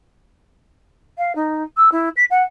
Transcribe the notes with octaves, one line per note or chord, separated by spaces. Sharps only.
F5
D#4
E6
E4
B6
F#5